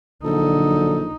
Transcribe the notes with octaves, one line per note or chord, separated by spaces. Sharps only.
A#1 D3 F#3 D#4 A4